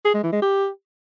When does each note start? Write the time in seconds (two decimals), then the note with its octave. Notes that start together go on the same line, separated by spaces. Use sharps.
0.05 G#4
0.14 G#3
0.23 E3
0.32 G#3
0.42 G4